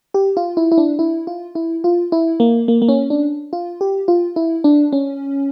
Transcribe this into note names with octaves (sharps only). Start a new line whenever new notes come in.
G4
F4
E4
E4
D4
E4
F4
E4
F4
E4
A#3
A#3
A#3
C#4
D4
F4
G4
F4
E4
D4
C#4